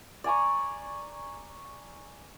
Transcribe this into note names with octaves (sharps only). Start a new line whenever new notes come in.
D5 G#5 A#5 C#6